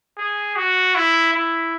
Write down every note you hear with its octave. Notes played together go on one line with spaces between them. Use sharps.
G#4
F#4
E4
E4